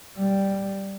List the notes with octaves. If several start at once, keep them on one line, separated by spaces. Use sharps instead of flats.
G3